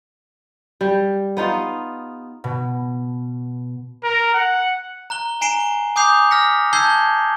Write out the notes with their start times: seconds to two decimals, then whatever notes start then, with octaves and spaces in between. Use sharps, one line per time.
0.81 G3
1.37 B3 D#4 F4
2.44 B2
4.04 A#4
4.34 F#5
5.10 A#5 F#6 G7
5.41 G#5 A#5 C7 D7 E7 G7
5.96 G#5 D6 D#6 G6 C7 F7
6.31 F6 A#6 B6 C#7
6.73 A5 E6 G6 G#6 C7 G7